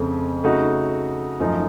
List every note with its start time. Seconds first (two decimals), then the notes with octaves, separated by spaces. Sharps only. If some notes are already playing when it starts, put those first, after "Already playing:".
Already playing: F2 C#3 A3 C4
0.43 C#3 A3 D#4 F#4
1.40 F#2 F3 A3 D#4